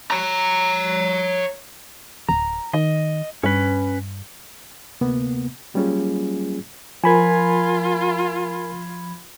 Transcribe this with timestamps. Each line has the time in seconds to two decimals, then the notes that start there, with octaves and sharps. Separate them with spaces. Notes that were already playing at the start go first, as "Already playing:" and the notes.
0.11 C#5 A#5
2.29 D1 A#5
2.73 D#3 D#5
3.43 G2 C#4 B4
5.01 D2 C3 A#3 B3
5.74 F#3 G3 A#3 C#4 F4 G#4
7.04 F3 F4 A#4 G#5 B5 G#6